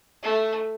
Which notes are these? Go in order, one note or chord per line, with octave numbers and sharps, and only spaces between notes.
A3